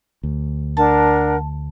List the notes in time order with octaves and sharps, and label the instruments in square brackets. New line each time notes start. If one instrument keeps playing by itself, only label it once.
[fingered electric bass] D2
[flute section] D4 A#4 F#5 [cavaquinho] A5